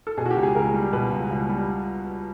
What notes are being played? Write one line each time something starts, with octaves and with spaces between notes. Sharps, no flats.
A4
B2 G#4
F#4
G4
C#2
G#4
C#2 A#4
G3
B2 B4
C#2
C#2
G3